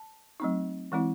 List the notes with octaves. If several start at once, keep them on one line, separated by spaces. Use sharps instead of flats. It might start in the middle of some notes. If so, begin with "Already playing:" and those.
Already playing: A5
F#3 A3 C4 D#4
E3 G#3 C4 E4